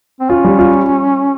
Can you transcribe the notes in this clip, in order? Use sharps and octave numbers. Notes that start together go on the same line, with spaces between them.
C4
C#4 F4
G3
F4